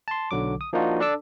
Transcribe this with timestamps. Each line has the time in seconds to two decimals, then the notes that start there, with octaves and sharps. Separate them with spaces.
0.08 A5 C6
0.31 B1 D3 F#3 D6
0.61 D#6
0.73 F3 A#3 D4 D#4 F4 F#4
1.00 D4 A4 D5 A5 D6 E6